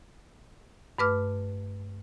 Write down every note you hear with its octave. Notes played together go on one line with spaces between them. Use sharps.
G2 A3 B4 D6 F6